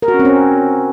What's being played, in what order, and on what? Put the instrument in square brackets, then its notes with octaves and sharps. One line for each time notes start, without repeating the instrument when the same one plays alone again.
[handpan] A#4
F#4
C#4
C4
C#4